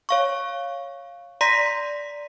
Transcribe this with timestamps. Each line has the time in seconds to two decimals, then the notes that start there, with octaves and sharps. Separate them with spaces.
0.09 C#5 F5 C#6
1.41 D5 A#5 C6 A#6 B6